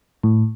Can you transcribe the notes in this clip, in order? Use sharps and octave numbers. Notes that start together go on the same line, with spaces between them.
A2